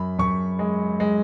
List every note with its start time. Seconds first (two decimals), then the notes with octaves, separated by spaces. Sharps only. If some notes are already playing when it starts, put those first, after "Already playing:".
Already playing: F#2 B5
0.19 F#2 C#6
0.59 G#3
1.00 G#3